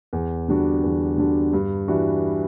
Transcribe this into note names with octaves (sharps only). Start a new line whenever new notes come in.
E2
D3 G3 D4 F#4
E2
D3 G3 D4 F#4
G2
E3 G3 D4 F#4